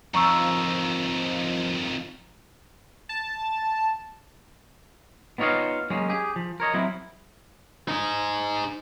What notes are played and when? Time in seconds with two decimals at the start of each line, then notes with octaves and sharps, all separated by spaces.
0.14 F2 D#3 F3 A#5 C#6 E6
3.09 A5
5.38 B3 D#4 F4 C#5 D#5 F5
5.90 F#3 G#3 A#3 C#4
6.09 G4 G#4
6.36 F3
6.60 A#4 C#5 D#5
6.74 F#3 C4 E4
7.88 D#4 G#4